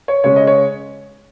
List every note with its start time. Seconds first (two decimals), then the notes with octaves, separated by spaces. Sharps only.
0.08 C#5
0.24 C#3 G#3 C#4 C#5
0.36 D#5
0.47 C#5